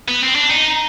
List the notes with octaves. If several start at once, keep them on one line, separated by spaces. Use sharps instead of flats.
B3
C4
D4
D#4